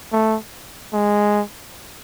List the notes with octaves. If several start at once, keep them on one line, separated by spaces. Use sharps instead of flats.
A3
G#3